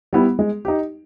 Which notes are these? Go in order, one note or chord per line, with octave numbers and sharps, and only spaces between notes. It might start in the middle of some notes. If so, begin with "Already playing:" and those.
G3 B3 E4
G#3
D#4 G4